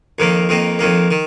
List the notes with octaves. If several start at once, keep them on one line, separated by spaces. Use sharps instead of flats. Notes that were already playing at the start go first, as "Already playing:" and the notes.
F2 D#3 A#3
F2 D#3 A#3
F2 D#3 A#3
D#3